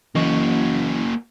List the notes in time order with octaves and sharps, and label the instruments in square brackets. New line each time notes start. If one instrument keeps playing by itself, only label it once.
[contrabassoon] F#1 [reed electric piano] E3 D#5 C#6 [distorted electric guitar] A#3 F#4